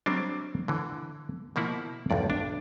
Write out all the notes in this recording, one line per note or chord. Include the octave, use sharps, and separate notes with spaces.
F#3 G3 C4 D4
D3 E3
B2 F3 A#3 E4 F#5
B1 E2 G2 D5
D4